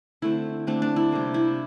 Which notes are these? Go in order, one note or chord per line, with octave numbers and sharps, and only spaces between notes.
D3 A3 C4 E4
D3 A3 C4 D4
D4
E4
C3 G3 A#3
E4